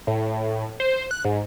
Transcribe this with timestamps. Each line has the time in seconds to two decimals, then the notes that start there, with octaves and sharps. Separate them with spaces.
0.07 A2
0.80 C5
1.11 F#6
1.25 G#2